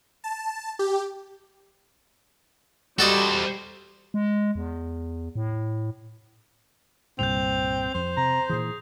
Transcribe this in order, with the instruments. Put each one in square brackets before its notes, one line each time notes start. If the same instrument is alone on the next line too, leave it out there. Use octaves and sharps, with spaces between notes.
[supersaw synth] A5
G4
[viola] G3 [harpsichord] F#4 D5 D#5 [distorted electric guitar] A4 C5
[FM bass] G#3
E2
A2
[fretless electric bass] C2 G2 A#2 [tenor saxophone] C4 [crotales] G6 F7
[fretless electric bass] F2 [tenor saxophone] C5
[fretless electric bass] C3 [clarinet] A#5
[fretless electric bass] A#2 E3 [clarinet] G#4